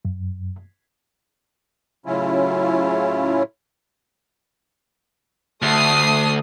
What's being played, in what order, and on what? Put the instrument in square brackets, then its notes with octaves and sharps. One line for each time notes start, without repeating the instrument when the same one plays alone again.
[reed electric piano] F#2
[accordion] A2 C#3 F#3 C#4 E4 F4
[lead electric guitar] D2 [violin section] A3 D#6 C7